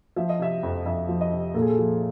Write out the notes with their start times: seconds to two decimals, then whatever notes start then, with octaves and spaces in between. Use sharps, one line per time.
0.16 F3 E5
0.29 D#5
0.39 C3 E5
0.63 F2
0.86 F2 E5
1.08 F3
1.21 D#5
1.32 C3
1.54 A#2 A4
1.62 G#4
1.69 A4
1.78 F3